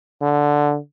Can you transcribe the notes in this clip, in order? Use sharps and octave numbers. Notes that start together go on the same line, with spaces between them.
D3